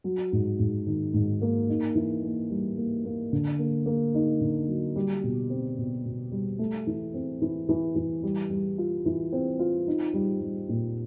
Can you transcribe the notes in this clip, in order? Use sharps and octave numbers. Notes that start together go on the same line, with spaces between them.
F#3
G#2
G#2
D#3
G#2
A#3
D#4
E3
A#3
G3
A#3
A#3
D3
A#3
A#3
D#4
D3
F#3
G3
B2
C4
B2
B2
G3
A3
E3
C4
E3
E3
E3
G3
G3
F4
E3
C4
F4
D#4
G3
G3
A#2